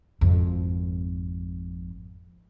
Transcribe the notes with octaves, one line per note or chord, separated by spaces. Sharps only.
G#1 F2